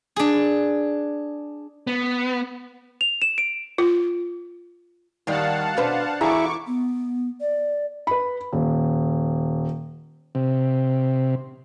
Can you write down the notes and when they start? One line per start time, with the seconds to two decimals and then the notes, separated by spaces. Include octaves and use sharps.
0.16 D4 G#4
1.87 B3
3.01 F7
3.22 E7
3.38 D7
3.78 F4
5.27 D#2 D#3 G3 F5 F#5 A5
5.77 B2 D4 B4 C5 D5
6.21 E1 E4 G#4 A#5 C#6 D6
6.67 B3
7.41 D5
8.07 B4 B5
8.53 D#1
10.35 C3